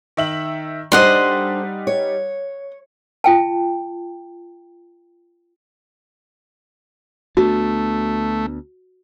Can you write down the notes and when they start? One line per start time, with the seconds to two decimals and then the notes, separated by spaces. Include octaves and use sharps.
0.17 D#3 E5 F#7
0.92 G3 D4 D#4 A4 C5 D#5 F#5 C6
1.87 C#5
3.24 F4 G5 A5
7.37 D2 A3 B3 D4 F#4